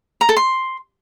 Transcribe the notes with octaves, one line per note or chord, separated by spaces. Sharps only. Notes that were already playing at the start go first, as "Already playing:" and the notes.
A#5
A4
C6